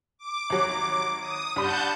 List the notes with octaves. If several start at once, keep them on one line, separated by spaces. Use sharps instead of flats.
D6
G#1 F#3
D#6
G2 G3 F#5 A5 B5 G6